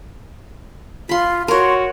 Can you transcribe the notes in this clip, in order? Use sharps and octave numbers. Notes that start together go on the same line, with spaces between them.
F4 B5 C6
F#4 A#4 C#5 C6